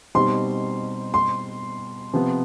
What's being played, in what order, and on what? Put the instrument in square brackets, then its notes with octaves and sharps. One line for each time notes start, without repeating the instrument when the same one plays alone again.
[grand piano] B2 G3 C4 D#4 [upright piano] C6
[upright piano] C6
[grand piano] C3 F3 B3